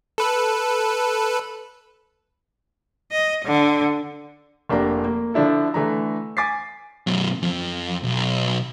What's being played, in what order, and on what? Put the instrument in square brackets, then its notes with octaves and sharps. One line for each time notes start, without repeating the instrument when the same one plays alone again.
[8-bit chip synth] A4 B4
[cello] D#5
D3
[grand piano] F1 A#3 D4 G4 A#5
A#3
D3 F3 D4 E4 A4
D3 E3 A3 A#5
G#5 D6 A6 B6 C7
[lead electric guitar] F#2 B2
F2
B1